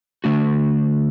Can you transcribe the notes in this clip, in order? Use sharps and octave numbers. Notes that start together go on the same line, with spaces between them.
D3 A3 D4 F#4